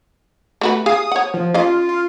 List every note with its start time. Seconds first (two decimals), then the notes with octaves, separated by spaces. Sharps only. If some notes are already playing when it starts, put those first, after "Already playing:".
0.61 A3 F#4 B4
0.86 G#4 F5 G#5 D#6
1.11 C#5 F#5
1.34 F3
1.54 C#4 F4 D#5 F5
1.89 F4